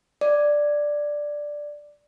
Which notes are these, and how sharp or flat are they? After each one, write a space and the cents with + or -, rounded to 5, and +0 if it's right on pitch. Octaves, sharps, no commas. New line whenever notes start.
D5 +0